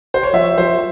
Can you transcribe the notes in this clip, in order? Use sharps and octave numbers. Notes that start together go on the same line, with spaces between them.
C5
C#5
F3 E5
F3 C5